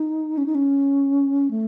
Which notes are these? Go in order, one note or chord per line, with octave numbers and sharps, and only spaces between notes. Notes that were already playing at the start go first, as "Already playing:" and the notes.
Already playing: D#4
C#4
D#4
C#4
A3